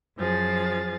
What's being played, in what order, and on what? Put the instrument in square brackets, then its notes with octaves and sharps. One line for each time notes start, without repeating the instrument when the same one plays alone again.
[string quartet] F#2 F3 G#4 A6